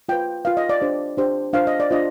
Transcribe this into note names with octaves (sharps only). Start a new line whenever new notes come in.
F4 B4 G5
F4 B4 F5
D#5
D5
D4 G4 C5
D4 G4 C5
D4 F4 C5 F5
D#5
D5
D4 F4 C5 D#5